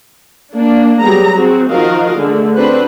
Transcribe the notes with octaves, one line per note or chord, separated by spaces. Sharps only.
A#3 D4
F#3 G3 B3 G#4 A#5
C4 F#4 G#4
D#3 F3 F#4 A#4 D#5 F5
D3 G#3 A3
C4 D4 F#4 B4 C5